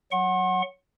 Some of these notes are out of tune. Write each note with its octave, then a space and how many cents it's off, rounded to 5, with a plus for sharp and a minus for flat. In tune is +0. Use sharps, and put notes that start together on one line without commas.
F#3 +0 F#5 +0 C6 +45